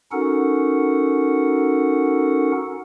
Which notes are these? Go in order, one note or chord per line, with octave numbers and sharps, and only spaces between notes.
C#4 D#4 F#4 A4 A#4 F#5